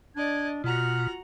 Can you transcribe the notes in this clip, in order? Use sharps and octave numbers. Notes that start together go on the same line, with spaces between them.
D4 D5 D#5 G#6
B2 F4 F#4 F#5 A#5 F6